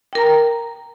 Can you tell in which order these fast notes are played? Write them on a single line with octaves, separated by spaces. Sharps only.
G5 A#4 A#5